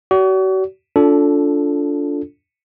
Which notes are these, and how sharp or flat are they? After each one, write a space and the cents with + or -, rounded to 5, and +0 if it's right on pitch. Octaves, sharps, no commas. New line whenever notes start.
F#4 +40 D5 -45
D4 -25 F4 +0 A4 +0